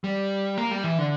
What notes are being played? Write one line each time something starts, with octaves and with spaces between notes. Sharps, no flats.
G3
A#3
G3
E3
D3